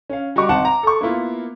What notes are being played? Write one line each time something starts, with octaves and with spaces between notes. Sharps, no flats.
C#4 F5
G3 F#4 D#5 C#6 D6
G#1 C4 D#4 F#5 A5
A#5
A4 C#6
A#3 B3 E4 F4